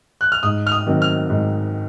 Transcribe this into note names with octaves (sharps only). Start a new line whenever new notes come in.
F#6
F6
G#2 D#6
F6
D#6
D#3 F#3 C4
F6
G#2